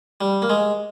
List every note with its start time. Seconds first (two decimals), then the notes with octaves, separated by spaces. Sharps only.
0.21 G3
0.42 A#3
0.50 G#3